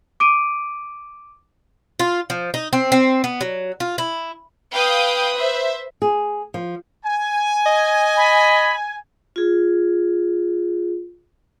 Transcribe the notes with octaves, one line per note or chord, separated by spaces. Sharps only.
D6 D7 D#7
F4
F3
D#4
C4
C4
B3
F#3
F4
E4
B4 F5 G5 D#6
C5 E5
G#4
F3
G#5
D#5
B5
F4 G#4